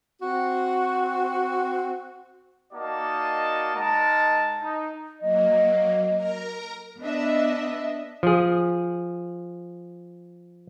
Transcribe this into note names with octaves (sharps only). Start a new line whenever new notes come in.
C4 F#4
A#3 D#4 F#4 D5 D#5 A5
G#3 D#4 A#4 A5
D#4
F#3 A#3 D#5
A#4 A#5
B3 D4 D#5 E5
F3 G#4